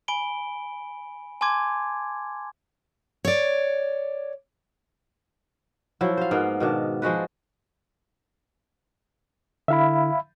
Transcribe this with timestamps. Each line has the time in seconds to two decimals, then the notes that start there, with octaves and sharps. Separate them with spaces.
0.08 G#5 B5 D7 G7
1.41 G#5 A5 C6 D6 G#6
3.25 C#5 D5
6.01 F3 F#3 E4
6.17 C5 F5
6.31 G#2 A#3 B3
6.60 B2 D#3 D4
7.02 F3 G#3 F#4 B4
9.68 D3 E4 E5 F5 B5